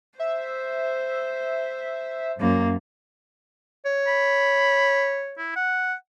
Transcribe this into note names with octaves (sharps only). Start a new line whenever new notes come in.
C5 E5
F#2 A#3
C#5
B5
E4
F#5